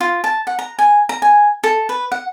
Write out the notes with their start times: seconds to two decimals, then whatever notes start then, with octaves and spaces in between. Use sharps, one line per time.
0.01 F4
0.24 A5
0.47 F#5
0.59 A#5
0.79 G#5
1.09 A#5
1.22 G#5
1.64 A4
1.89 B4
2.12 F#5